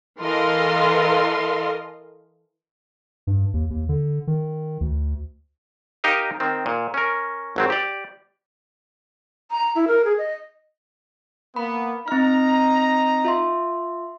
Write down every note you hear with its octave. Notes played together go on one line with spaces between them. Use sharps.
E3 A4 A#4 D#5 F5 C6
G2
D#2
D#2
D3
D#3
D2
D#4 G4 A#4 D#5 F5
D#3 C4
A#2
C#4 A#4
G#1 F#3 C4
G4 D5
A#5
E4
A#4
G#4
D#5
A#3 B3 B5
C4 D#4 A#5 F6
F4 E5 C6